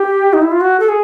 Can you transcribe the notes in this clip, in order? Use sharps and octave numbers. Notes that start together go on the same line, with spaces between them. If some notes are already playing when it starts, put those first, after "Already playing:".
Already playing: G4
D#4
E4
F4
F#4
A4
G#4